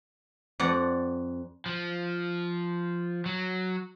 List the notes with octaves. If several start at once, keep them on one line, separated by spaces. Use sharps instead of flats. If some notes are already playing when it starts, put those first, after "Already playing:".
F2 D5 F#5
F3
F#3